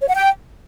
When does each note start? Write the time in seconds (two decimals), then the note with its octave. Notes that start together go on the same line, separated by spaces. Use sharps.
0.01 C#5
0.08 F#5
0.14 G5